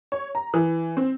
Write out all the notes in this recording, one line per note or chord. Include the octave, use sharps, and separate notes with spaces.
C#5
A#5
E3
C4